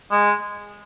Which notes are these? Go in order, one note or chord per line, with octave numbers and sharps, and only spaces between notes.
G#3